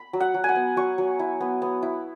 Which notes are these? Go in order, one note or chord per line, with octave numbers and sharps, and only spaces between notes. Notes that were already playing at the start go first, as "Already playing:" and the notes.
Already playing: B5
F#3
F#5
F#3
F#5 G#5
B3
F#3 C#6
F#3
E4
B3
B3
E4